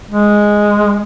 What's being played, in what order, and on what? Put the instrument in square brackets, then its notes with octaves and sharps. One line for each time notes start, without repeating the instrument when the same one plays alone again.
[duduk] G#3